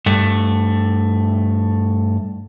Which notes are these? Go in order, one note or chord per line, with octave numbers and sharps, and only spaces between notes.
G2 A3